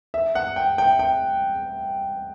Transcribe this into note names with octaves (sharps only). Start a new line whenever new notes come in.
E5
F#5
G5
G5
G5